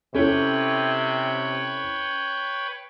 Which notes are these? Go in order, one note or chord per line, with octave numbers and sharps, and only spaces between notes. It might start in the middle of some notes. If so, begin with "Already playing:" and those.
C3 C#4 E4 A4 B4 C#5 G5